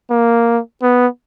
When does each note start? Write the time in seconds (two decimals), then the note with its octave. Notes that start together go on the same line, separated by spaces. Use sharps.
0.10 A#3
0.82 B3